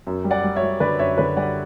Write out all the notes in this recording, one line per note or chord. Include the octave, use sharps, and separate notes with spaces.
F#2
G3
D5 F#5
G3
C#5 E5
G3
D3 B4 D5
F#2 C#5 E5
D3 B4 D5
G3 D5 F#5